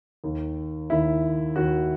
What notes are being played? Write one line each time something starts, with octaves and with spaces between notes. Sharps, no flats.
D#2 D#3
D#2 D#3 E4
D#2 D#3 F#4